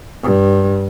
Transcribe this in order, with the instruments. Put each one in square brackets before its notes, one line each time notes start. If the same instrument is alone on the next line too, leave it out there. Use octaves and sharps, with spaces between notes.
[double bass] G2